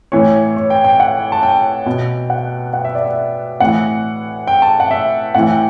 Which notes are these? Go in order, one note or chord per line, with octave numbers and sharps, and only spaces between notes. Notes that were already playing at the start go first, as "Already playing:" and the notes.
A2 E3 C#5
C#5
G5
G5
F#5
A5
G5
B2
F#5
F#5
E5
D5
E5
A2 E3 F#5
G5
A5
F#5
E5
A2 E3 F#5
G5